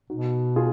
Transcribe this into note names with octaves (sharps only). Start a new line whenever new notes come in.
B2 D#4 F#4
F4 G#4